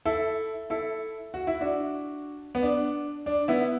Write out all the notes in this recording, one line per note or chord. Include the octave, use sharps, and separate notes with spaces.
E4 A4
E4 A4
F#4
E4
D4 F#4
B3
D4
D4
B3 E4